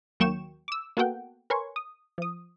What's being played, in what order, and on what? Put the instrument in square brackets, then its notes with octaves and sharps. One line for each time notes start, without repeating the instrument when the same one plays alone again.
[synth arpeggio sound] D#2 F#3 A#3 G5 C#6 E7
D6 E6
A#3 B3 F#4 A4 F#5 G5
A#4 B4 C#5 G#5 C6 C#6
D#6
F3 D#6